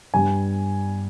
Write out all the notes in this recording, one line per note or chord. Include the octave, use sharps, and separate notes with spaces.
G2 G3 G#5